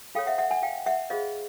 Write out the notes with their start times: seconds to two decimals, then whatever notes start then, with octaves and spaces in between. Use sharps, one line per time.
0.15 F4 A4 C#5 F5 G5
0.26 E5 F#5
0.38 E5 F#5
0.51 F#5 G#5
0.63 F5 G5
0.86 E5 F#5
1.10 F4 G#4 C5 D#5 F5